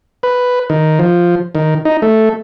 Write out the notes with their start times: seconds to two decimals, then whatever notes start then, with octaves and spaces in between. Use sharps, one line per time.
0.23 B4
0.70 D#3
0.99 F3
1.55 D#3
1.85 D#4
2.02 A3